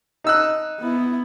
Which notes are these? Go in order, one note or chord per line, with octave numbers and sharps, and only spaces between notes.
D#4 E6 F#6
B3 E4